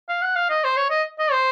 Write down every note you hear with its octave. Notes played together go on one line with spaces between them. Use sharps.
F5
F#5
F5
D#5
C5
C#5
D#5
D#5
C5